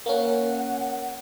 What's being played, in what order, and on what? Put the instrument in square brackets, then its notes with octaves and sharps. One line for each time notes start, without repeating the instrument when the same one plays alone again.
[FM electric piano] A#3 C#4 [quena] F#5